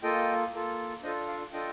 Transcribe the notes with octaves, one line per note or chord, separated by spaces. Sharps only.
A#3 F4 A4 D#5 G5
A#3 F4 A4
D4 F4 A4 C5 D#5
D5 F5
D4 F4 A4 D#5 G5